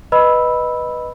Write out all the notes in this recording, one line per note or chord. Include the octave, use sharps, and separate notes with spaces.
B4 D#5 B5 E6